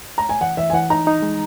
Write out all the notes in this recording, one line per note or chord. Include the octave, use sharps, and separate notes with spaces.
A#5
G#5
E3 F#5
E3 E5
G#5
E3 F#5
D#4 A#5
D#4
G#3